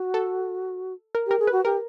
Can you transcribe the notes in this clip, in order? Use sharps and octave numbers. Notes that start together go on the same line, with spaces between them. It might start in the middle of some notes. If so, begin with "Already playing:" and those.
Already playing: F#4
A4
A#4
G4 A#4
G#4
F#4 B4
G4 A#4